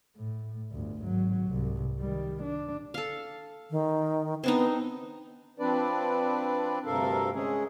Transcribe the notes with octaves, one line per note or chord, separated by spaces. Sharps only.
A2
G1 D2
G#1 F#3
C2 G#2
D#3 G3
D4
A4 F5
D#3
B3 C4 D4 D#4
F3 C4 D4 B4 D5
D2 G2 C3 A4 A#4 F5
G#3 C#4 G#4